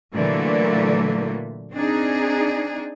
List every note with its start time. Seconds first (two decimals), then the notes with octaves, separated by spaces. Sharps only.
0.14 A#2 D3 E3 F#3 A3 A#3
1.73 C4 D4 D#4 G#4